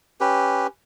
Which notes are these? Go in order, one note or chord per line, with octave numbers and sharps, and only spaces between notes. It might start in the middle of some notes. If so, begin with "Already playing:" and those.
C#4 G4 B4